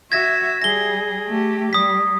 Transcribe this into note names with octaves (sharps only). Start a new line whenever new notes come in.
F#4 E5 G#6 A#6
G3 G#4 A#6 G7
A3 G4
G3 D#6 B6